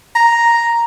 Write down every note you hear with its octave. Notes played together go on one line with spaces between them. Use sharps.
A#5